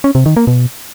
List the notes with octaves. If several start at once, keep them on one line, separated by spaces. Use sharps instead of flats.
C#4
C3
D#3
A#3
B2